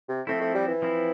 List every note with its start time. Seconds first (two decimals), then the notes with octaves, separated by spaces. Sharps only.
0.09 C3
0.27 F3 A3 C4 E4
0.41 A3
0.54 G3
0.68 E3
0.82 F3 C4 E4